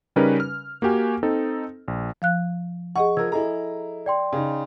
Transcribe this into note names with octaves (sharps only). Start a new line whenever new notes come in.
C#3 G3 C#4 D#4 A#4 B4
F6
A#3 F#4 G4 G#5
C4 D#4 A4
A#1
F3 F5 F#6
G#4 D#5 F#5 C#6
F3 A#4 E6 G#6
E4 G#4 A4 D#5 A#5
D5 G5 C6
C#3 D#4